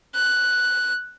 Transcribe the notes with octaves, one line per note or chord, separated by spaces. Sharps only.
F#6